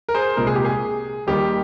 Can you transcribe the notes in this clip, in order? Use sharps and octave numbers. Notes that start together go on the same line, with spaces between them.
A#4
G#4 C5
C2 A#2 G#3 A#4
G#4
G4
G#4
D#2 D#3 G3 G4